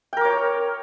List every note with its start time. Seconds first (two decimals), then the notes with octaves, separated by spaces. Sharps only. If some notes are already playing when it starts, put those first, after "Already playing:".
0.13 G5
0.17 A#4
0.21 D6
0.25 C#5